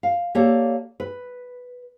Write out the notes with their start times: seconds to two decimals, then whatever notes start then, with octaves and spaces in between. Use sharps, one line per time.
0.03 F5
0.35 A#3 G4 A4 C#5 D5
1.00 B4